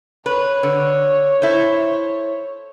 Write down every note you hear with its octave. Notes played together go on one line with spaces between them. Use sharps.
B4 C#5
D3
E4 A4 C5